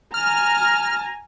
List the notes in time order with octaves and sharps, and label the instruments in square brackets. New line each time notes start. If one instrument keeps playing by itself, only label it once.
[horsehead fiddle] G#5 A#5 [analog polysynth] F6